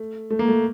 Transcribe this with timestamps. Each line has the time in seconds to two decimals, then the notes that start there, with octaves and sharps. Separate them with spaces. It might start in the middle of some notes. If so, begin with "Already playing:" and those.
Already playing: A3
0.31 A3
0.39 A#3
0.48 A3